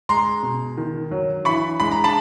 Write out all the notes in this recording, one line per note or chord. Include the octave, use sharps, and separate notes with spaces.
G#3 A#5 C6
B2
D#3
F#3
E3 B5 C#6
G#3 B5
A#5
A5 B5